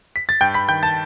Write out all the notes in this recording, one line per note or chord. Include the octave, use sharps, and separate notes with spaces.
B6
A6
G2 G5 G6
B5 B6
D#3 G5 G6
A5 A6